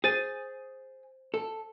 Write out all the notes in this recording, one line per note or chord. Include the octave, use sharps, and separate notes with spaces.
G#4 C5 A6 D#7
A4